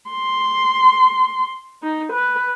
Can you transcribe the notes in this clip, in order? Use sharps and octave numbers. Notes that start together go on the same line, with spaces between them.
C6
D#4
B4